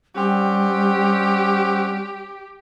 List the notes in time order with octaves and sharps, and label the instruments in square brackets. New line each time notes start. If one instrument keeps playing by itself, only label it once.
[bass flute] G3 [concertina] C4 C#4 F#5 [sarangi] G4